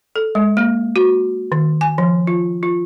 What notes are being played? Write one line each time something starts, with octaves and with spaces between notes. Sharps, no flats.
A4
G#3
A#3
F#4
D#3
G#5
F3
F4
F4